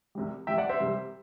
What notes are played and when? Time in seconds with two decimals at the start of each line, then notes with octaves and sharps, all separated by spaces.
0.15 C2 C3 G3
0.47 C2 C3 G3 E5 G5
0.58 D5 F#5
0.69 C5 E5
0.80 C2 C3 G3